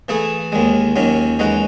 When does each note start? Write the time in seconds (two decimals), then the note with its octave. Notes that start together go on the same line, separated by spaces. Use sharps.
0.09 E3 A3 E4 G#4
0.52 D#2 D#3 G#3
0.96 D#2 D#3 F#3 C#4
1.39 E3 G#3 D#4 F#4